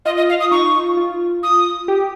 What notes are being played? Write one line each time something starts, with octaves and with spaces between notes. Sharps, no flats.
F4 D#5
D#5
F5
D#6
D#4 C#6
F4
D#6
G4